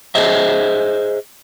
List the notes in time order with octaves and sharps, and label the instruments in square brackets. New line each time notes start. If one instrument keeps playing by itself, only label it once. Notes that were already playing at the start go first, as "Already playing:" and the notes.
[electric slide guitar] G#4 C5 D#5 E5